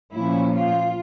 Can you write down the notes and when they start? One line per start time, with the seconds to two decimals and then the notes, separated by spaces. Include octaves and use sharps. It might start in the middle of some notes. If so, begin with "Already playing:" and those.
0.13 A#2 F3 A#3 C#4 E4
0.55 F4